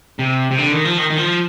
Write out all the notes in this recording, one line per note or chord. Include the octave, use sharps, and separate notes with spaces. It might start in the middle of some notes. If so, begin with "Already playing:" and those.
C3
C3
D3
D#3
F3
D#3
D#3
F3